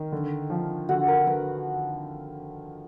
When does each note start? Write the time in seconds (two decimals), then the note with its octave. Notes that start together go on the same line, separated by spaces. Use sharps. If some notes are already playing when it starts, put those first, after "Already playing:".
Already playing: D#3 D#4
0.12 D3
0.50 F3
0.89 D3 F#4
1.08 A#4
1.27 D3 B4